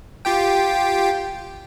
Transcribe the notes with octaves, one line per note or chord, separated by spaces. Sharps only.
F4 G4 G5